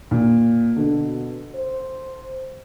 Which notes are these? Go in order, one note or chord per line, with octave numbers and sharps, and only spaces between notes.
A#2
B2 D3
C5